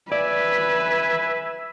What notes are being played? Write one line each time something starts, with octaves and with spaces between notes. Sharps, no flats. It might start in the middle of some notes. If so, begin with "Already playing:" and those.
B4 D5 E5 G#5